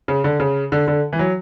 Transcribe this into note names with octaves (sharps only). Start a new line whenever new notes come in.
C#3
D3
C#3
D3
D3
E3
F#3